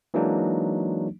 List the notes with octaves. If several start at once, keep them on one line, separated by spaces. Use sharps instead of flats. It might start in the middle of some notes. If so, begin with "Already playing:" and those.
E3 F#3 G#3 A#3 D4 D#4